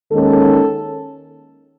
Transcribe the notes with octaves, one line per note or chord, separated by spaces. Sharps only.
D#2 D#3 G#3 C#4 A4